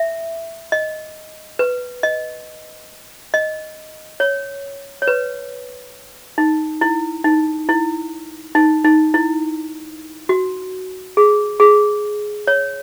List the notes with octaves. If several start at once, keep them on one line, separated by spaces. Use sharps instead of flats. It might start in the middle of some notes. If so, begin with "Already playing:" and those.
Already playing: E5
D#5
B4
D#5
D#5
C#5
C#5
B4
D#4
E4
D#4
E4
D#4
D#4
E4
F#4
G#4
G#4
C#5